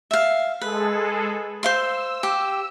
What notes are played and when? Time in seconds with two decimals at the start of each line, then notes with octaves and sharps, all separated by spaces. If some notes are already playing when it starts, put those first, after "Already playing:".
0.11 E5 F5
0.61 G#3 G#4 A4 B4
1.63 C5 F5 C6 E6
2.23 G4